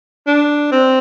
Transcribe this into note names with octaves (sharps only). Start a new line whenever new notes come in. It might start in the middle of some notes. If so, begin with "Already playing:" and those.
D4
C4